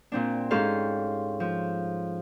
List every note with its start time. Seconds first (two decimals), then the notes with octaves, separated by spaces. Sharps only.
0.12 A#2 C4 D4
0.51 G#2 C#4 G4 A4 F5 C6
1.40 F3